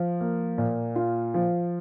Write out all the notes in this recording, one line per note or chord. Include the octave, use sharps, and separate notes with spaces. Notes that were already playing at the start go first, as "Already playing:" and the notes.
Already playing: F3
A#3
A#2
F4
F3